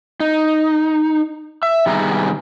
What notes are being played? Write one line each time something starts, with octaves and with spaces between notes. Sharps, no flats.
D#4
E5
C3 D#3 G3 B3 G#4 A#5